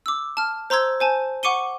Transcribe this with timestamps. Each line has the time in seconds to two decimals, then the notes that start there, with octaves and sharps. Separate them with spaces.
0.06 D6 E6
0.37 A5 F6
0.70 C5 A#5 C6 E6 G#6
1.00 C5 G#5 A5
1.43 F#5 C#6 D6 C#7 D#7 G7